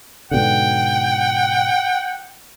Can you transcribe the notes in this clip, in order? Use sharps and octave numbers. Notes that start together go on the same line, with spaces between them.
G#2 B2 D3 F#5 G5